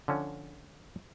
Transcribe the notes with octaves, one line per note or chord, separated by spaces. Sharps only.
D3 F3 C#4